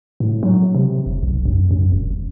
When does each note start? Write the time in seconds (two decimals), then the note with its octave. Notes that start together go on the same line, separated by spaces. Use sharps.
0.20 A2
0.43 F#3
0.74 C3
1.06 F1
1.23 B1
1.45 F#2
1.71 F#2
1.92 E1
2.11 E1